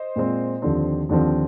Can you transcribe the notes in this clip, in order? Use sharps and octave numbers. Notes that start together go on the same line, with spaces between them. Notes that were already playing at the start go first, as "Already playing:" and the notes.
Already playing: C5 D#5
A#2 G#3 C4
D#2 D3 F3 C4
D#2 D3 F3 C4